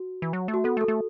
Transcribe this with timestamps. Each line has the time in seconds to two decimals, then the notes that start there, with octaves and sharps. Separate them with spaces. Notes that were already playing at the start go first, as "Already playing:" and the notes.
Already playing: F#4
0.22 E3
0.33 F#3
0.48 A3
0.54 F#4
0.64 B3 A4
0.77 A3
0.81 A4
0.88 A3